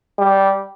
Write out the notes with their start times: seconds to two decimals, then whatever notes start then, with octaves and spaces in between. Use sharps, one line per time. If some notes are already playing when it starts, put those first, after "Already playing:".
0.19 G3